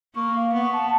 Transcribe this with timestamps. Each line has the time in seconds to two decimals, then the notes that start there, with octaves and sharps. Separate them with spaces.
0.15 A#3 C#6
0.34 F5
0.54 B3 C#6
0.73 A5